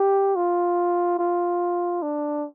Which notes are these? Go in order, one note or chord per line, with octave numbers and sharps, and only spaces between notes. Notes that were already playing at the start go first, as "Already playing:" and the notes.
Already playing: G4
F4
F4
D4